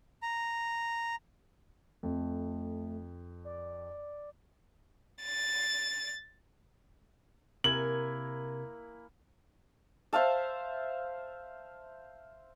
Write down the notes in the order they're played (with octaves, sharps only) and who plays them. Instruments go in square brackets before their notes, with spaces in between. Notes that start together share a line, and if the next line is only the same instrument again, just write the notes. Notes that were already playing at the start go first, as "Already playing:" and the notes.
[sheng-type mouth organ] A#5
[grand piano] F2 [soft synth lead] A3
[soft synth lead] D5
[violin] A6
[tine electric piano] C3 A#4 G#6 [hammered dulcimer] A#3 E4 G#5 [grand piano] F#7
[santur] C5 E5 F5 A5